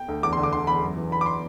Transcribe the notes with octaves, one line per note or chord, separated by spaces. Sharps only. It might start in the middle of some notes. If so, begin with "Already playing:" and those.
Already playing: G5
D2
E2 D6
C6
D3
D6
D3 C6
E2 B5
F#2
E3
E3 B5
D6
C6